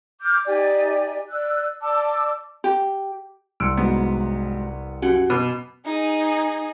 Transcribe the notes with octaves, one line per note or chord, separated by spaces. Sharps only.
D6 F6 G6
D#4 G4 D5 G#5
D5 E6 F#6
D5 A5 D6 E6
G4
C2 C6 E6 F#6 C#7 D7
G#2 F#3 B3
F#2 C#4 F#4 G4 F#5
B2 B5 D6 D#7
D#4 G#4